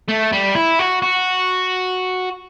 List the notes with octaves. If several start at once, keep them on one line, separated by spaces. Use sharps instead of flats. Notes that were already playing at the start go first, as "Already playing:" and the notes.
A3
G3
E4
F#4
F#4